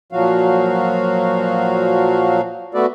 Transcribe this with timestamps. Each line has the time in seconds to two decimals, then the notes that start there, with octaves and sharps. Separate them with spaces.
0.12 A#2 F3 F#3 F#4 F5
2.74 A3 B3 F#4 A4 B4 D5